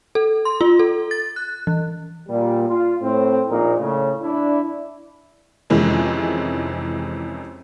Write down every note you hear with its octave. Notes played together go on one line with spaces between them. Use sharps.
A4
C6
F4
A4
A6
F#6
E3
A#2 G3
F4
A2 C4
A#1 A#2 D#4 A#4
A2 C#3
D4 E4
F2 C3 D#3 E3 G#3 C#4